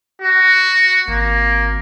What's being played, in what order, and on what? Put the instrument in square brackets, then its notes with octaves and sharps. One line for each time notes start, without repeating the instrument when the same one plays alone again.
[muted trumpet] F#4
[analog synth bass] G#1 [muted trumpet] A#3